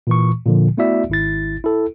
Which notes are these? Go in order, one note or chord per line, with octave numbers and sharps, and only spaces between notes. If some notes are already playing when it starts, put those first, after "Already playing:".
A#2 E3 C#6
A#2 D3 F3
A3 B3 E4 F#4 D5 E5
G#1 E4 A6
E4 A4